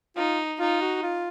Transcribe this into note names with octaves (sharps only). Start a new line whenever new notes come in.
D#4 F4
D#4 F4
F#4
F4